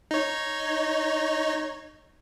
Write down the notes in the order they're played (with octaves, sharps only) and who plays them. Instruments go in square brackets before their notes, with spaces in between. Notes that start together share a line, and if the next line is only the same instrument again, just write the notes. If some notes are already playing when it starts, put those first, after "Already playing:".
[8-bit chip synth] D#4 C#5